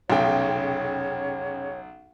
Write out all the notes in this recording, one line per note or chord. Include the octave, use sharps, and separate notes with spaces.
F1 B1 C#3 C#5 G5